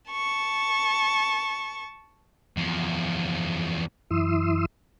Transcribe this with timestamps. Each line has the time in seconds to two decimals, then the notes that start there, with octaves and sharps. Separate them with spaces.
0.11 A5 C#6
2.57 E2 F3
4.10 F#2 E3 E4 C6 D#6 E6